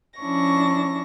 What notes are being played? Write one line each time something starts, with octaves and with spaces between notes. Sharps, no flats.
F3 C#4 D4 E4 C#6 A#6